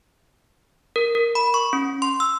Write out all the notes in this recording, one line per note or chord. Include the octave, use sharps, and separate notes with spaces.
A#4
A#4
B5
C#6
C#4
C6
E6